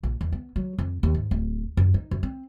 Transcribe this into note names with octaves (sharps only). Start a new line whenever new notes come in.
A#1
E2
B3
F#3
F2
D#2
G#2
D1
F#2
D#4
F#2
C4